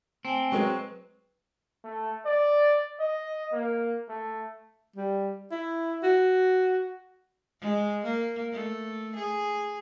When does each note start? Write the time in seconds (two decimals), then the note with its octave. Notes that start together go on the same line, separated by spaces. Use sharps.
0.25 A3 C4 G#5
0.52 F#3 G#3 B4 C#6
1.84 A3
2.26 D5
3.01 D#5
3.53 A#3
4.09 A3
4.96 G3
5.51 E4
6.03 F#4
7.60 G#3
8.04 A#3
8.52 A3
9.16 G#4